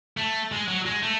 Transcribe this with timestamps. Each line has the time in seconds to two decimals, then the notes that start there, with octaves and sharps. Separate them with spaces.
0.17 A3
0.52 G#3
0.68 F#3
0.86 G#3
1.03 A3